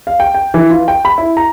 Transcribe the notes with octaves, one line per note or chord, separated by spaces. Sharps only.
F5
G5
G5
E3
F4
G5
B5
E4
A#5